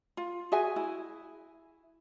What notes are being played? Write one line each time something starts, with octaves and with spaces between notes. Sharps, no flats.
F4
F#4 G#4 E5 G#5
E4